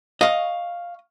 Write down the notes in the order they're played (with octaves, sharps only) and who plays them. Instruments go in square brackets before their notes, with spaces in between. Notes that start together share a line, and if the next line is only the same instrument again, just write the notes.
[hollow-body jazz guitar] D#5 [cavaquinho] F5 C#6